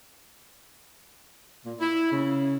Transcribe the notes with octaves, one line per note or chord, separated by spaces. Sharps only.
A#2
E4
C#3